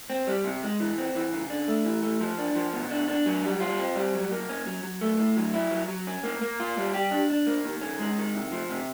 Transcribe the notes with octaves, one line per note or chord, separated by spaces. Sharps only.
C4
G3
C3
G#3
E3
C4
E3
C#3
D4
A3
E3
A3
F3
D4
F3
B2
D4
D4
F#3
G3
F4
C4
G3
F#3
A#3
C#4
F#3
F#3
A3
A2
F#3
E4
F#3
F#3
C#4
A#3
A#3
F4
G3
G4
D4
D4
A#3
D#3
C#4
G#3
D#3
C3
F3
C3